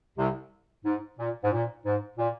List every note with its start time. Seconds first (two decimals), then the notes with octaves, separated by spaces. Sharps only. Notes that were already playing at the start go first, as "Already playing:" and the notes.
0.18 C2 C3
0.85 G#2
1.19 A#2
1.44 G#2
1.52 A#2
1.85 G#2
2.18 A#2